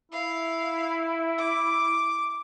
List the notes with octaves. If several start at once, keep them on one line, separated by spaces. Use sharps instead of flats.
E4 F5
D6